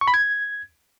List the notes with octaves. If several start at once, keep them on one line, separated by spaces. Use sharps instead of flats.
C#6
B5
G#6